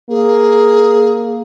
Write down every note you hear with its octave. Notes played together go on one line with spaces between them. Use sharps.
A#3 G#4